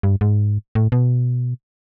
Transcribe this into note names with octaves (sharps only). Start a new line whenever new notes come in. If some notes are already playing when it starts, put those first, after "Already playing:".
G2
G#2
A2
B2